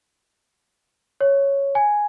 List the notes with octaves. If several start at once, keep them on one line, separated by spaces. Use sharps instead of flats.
C#5
G#5